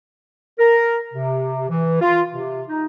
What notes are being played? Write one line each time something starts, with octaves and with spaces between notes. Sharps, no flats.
A#4
C3
E3
F4
C3
D#4